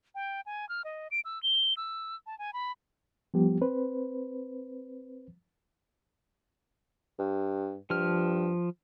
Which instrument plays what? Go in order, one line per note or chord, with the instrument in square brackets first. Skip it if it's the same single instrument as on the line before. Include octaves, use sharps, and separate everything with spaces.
[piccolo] G5
G#5
F6
D#5
D7
E6
G7
E6
A5
G#5
B5
[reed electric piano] F3 G3 B3 G4
C4 B4 C5
[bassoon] G2
[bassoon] G2 [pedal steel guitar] F3 F6